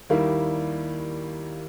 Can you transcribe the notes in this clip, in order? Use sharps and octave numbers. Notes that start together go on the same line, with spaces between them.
D#2 D#3 G3 A#3 E4